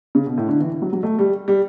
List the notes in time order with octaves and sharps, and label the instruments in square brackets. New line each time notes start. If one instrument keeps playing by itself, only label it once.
[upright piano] C#3
B2
A2
D3
E3
F#3
F#3
A3
G3
G3